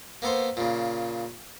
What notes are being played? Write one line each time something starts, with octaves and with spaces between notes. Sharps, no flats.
A#3 B3 A4 C5
A#2 C#3